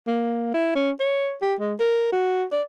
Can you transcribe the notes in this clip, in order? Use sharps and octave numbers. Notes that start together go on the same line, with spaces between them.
A#3
E4
C#4
C#5
G4
G#3
A#4
F#4
D5